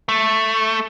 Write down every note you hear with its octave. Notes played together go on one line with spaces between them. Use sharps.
A3